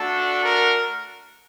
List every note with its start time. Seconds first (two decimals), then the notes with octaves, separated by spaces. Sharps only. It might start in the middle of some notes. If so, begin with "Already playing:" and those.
Already playing: A3 D4 F#4 A4
0.45 A#4